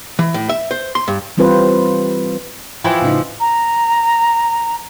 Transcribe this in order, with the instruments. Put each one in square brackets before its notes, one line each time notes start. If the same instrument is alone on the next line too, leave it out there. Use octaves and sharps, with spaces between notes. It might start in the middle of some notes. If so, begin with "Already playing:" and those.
[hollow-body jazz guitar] E3
A2
E5
C5
C6
G2
[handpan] E3 G3 C4 F4 B4 C5
[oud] E3 F3 E4 [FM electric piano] G5 G#5
[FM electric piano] A2 C#3 D#4
[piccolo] A#5